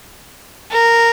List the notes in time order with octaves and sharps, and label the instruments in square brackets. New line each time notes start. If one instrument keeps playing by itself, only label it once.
[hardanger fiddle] A#4